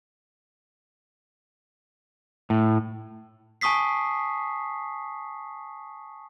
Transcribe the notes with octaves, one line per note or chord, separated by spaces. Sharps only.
A2
G#5 A5 C#6 D#6 B6 C7